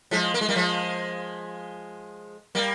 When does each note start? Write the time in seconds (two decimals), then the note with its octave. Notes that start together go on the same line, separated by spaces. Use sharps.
0.11 F3 G#3
0.34 A#3
0.41 G#3
0.49 G3 A#3
0.56 F3 G#3
2.55 G3 A#3